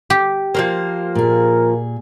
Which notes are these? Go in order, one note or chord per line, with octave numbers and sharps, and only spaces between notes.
G4
F3 G#3 A#3 C5
A#2 G#4 A#4